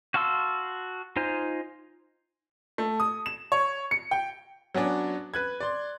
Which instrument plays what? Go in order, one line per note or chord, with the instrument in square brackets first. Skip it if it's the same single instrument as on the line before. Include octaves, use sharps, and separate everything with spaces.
[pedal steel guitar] F#4 F5 A5 C6 E6
D#4 F4 C5 G#5
[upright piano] A3
D#6
E7
C#5
C#7
G5
F#3 B3 C#4 D4
B4 F#6 G#6
D5 C6